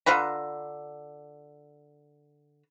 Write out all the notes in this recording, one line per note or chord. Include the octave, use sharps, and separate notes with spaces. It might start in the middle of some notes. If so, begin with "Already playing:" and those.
D3 F4 B4 A#5